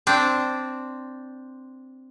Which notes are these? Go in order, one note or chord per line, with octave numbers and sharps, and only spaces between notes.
C4 D4